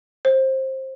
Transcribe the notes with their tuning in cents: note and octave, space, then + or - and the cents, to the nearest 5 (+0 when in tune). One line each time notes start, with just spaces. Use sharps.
C5 +20